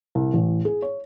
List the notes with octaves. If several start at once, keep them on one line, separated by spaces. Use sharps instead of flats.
C2
A1
G#4
C#5